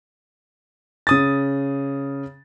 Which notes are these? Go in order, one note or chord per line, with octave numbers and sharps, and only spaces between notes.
C#3 D#6 A6